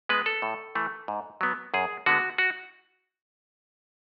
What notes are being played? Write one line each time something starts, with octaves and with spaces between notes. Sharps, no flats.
G#3 B3 B4
A4
A2
E3 A3
G#2
F#3 B3
F#2 G#4
D3 G#3 B3 F#4
F#4